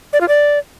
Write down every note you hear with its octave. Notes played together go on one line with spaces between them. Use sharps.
D5
F4
D5